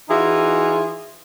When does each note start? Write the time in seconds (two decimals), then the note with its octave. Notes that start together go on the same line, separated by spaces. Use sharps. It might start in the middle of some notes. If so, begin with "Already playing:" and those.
0.09 E3 D#4 F4 F#4 G#4